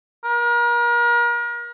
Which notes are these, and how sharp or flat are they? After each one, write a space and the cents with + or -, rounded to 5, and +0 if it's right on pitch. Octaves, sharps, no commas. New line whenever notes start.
A#4 +35